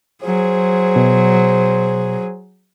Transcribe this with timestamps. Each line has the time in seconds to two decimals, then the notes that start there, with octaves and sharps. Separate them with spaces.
0.24 F#3 G#4 C5
0.96 B2